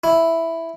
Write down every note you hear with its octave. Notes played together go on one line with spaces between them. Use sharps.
E4